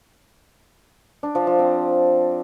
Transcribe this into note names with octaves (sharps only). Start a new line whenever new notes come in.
D4
F3
F3
C4